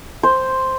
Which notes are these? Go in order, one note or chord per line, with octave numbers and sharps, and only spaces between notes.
C5